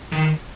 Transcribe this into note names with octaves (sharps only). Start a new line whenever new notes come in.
D#3